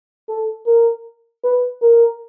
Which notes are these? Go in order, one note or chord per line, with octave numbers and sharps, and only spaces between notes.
A4
A#4
B4
A#4